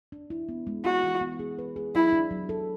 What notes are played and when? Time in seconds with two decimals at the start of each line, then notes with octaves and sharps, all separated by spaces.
0.12 D4
0.30 E4
0.49 B3
0.67 G#3
0.85 E4 F#4
1.03 E3
1.21 B3
1.39 G#4
1.59 B4
1.76 G#4
1.95 F#3 E4
2.13 D4
2.31 F#3
2.49 A4